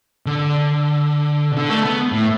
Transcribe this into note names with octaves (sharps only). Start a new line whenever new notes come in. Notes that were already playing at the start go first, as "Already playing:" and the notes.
D3
B2
D3
A3
B3
A2